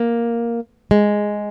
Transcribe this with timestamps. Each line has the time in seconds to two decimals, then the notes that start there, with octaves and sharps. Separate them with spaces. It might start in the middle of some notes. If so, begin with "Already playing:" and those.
Already playing: A#3
0.91 G#3